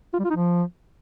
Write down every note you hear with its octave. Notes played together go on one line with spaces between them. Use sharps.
F4
G3
F4
D#4
F3